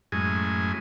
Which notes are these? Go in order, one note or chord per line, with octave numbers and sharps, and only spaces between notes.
F#2 A2 G#3 G#5